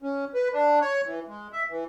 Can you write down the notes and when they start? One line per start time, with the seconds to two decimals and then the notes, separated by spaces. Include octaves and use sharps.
0.02 C#4
0.34 B4
0.53 D4
0.81 C#5
1.06 E3
1.28 G#3
1.53 E5
1.71 E3